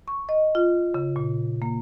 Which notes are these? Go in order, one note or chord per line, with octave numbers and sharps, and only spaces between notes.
C#6
D#5
F4
C#3
A#2
A#3